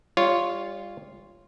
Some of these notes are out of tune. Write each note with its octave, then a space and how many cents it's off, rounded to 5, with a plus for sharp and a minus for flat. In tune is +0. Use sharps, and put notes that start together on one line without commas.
G3 +25 F4 -5 C#5 +0